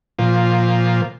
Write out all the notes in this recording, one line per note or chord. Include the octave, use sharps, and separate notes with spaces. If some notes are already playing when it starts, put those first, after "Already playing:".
A#2 F3